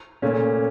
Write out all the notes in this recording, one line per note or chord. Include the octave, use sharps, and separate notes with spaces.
A#2 A3 C#4